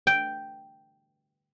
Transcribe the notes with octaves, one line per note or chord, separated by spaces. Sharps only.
G5